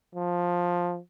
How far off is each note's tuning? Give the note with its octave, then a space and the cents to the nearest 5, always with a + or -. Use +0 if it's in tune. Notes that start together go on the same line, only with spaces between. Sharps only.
F3 +10